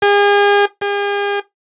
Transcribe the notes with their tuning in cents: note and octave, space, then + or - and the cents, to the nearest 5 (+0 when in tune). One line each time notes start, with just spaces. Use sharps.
G#4 -40
G#4 -45